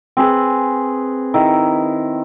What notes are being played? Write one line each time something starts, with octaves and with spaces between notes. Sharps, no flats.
C4 G#4 B4
D#3 E4